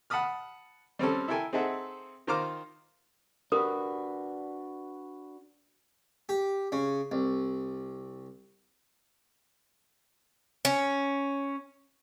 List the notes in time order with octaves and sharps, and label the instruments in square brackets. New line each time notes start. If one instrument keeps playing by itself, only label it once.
[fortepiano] F#5 A5 B5 D#6 F6
G3 C4 C#4 A4
E4 A4 A#4 G5 G#5
C4 D#4 G#4 A4 E5 F#5
D#3 F4 C5 A#5 D6 F6
[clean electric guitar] D4 F#4 B4 [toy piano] G4 A#4 D#6
[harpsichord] G4
C#3
C2
[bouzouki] C#4